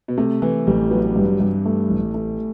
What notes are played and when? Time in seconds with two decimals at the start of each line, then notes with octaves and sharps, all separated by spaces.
0.08 B2
0.18 C3 A3
0.42 E3 A3
0.67 A1 G3
0.91 F#3 B3
1.16 G2
1.40 G2
1.65 A3
1.90 A1
2.14 A3